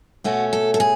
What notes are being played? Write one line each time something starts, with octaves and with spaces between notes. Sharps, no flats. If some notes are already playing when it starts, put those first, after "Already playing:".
B2 A3 C#4 F#4
A4
A4
G#4